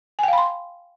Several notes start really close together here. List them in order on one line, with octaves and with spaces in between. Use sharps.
G#5 G5 F5 B5 C6